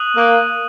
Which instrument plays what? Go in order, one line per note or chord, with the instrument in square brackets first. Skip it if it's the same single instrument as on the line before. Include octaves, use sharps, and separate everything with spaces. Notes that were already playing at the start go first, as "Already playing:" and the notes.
Already playing: [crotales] D#6 F#6 D#7 F#7
[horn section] A#3